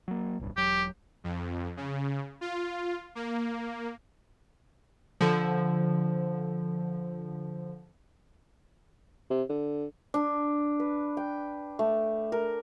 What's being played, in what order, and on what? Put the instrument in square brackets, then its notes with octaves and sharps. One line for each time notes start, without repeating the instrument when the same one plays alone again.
[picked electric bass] F#3 A#3
D1 B1 G2
[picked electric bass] E1 F#3 [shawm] G4
[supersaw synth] F2
C#3
F4
A#3
[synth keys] D3 F3
[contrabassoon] C3
D3
[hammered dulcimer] D4
B4
G5
A3
A#4